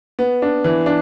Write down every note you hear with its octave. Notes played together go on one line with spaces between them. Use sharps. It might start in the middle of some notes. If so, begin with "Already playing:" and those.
B3
D4
E3
D4